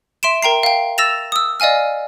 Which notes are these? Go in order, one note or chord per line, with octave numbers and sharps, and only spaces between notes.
E5 C6 D7 E7
A#4 G5 A#5 C7
F5 G5
E6 A6 A#6 E7 F7
D#6 E6
D5 D#5 F5 G#5 F6